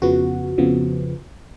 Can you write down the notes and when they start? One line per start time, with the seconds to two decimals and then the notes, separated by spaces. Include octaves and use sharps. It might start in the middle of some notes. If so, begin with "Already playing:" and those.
0.02 F2 C#3 F3 B3 F#4
0.58 F2 C#3 F3 B3